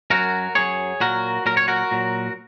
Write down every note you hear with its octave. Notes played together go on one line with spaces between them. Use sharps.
F#2 F#3 F#4 A#4
F#2 F#3 G#4 C#5
A#2 F#3 F#4 A#4
A#2 F#3 A#4
C#5
F#4 A#4
A#2 F#3